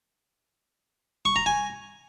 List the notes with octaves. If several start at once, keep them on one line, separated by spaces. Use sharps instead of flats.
C#6
A#5
G#5